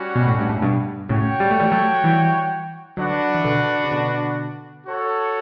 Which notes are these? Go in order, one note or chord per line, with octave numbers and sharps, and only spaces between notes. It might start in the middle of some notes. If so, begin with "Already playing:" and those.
Already playing: G3 C#4 F#4
B2
A2
G2
A2
G2 B2
A2 C#3 F#4 C#5 G5
G3
A3
E3 G3
F#3 A3
E3 G3
D3 F#3 D4 F#4 B4 F#5
E3
B2 D3
C#3
B2 D3
F#4 A4 C#5